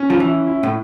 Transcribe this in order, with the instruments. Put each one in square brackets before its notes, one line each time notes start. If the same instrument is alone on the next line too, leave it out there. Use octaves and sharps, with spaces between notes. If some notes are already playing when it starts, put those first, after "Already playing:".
Already playing: [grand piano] C#4
[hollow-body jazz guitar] F3
[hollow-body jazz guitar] E3 [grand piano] E4
[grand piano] E4
[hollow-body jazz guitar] A2